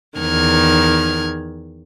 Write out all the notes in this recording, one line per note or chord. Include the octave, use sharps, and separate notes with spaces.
E2 D#3 F6 G#6